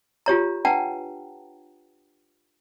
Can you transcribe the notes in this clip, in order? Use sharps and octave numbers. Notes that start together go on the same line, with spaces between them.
F4 G4 C#5 A#5
D4 B4 F#5 G5 A5 A#5